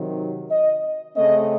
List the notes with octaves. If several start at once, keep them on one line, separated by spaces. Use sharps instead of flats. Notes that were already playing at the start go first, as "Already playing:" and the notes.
Already playing: C3 D#3 F#3
D#5
C#3 A3 C4 D#5